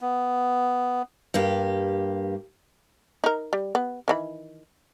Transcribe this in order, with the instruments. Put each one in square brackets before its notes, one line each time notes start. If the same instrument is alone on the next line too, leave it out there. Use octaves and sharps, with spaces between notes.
[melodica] B3
[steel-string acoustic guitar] G2 A#3 G4
[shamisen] D#4 A#4
G3
B3
D#3 E3 B5